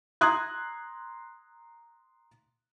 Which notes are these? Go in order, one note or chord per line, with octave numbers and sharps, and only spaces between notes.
A#5 C6 D#6 F#6 G#6